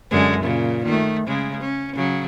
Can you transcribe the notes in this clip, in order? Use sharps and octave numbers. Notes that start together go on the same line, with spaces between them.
F#2 D3 G#3
A#2 C#3
D#3 A3
C#3 G#3
C#4
C#3 F#3